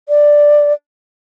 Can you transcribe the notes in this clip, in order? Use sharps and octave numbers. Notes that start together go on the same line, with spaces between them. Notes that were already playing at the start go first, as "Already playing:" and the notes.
D5